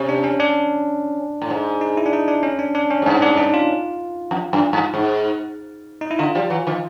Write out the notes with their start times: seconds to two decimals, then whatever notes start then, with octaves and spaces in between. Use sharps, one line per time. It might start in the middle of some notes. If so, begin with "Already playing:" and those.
Already playing: C3 C#4
0.09 D4
0.24 C#4
0.40 D4
1.42 A2
1.50 G#2
1.81 D#4
1.97 E4
2.06 D4
2.13 D#4
2.28 D4
2.43 C#4
2.59 D4
2.75 D4
2.91 C#4
3.02 G#2
3.06 G2 C#4
3.22 D4
3.38 D#4
3.54 F4
4.31 F2
4.53 F#2
4.73 G2
4.94 G#2
6.01 D#4
6.11 E4
6.19 D3 F4
6.35 F3 G3
6.50 E3 F#3
6.67 D#3 F3